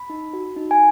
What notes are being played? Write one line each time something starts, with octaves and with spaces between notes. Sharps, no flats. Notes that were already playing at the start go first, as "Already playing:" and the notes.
Already playing: B5
D#4
F#4
D#4
G#5